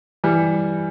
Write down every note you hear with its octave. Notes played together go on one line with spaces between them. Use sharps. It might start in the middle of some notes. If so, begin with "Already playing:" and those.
E3 G3